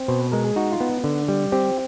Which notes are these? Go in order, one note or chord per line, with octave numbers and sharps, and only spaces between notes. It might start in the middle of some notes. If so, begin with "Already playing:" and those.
Already playing: C4
B2 C5
B4
G#3 A#4
G#4
D#4 F#4
F4
B3
D3
G3
C4 G4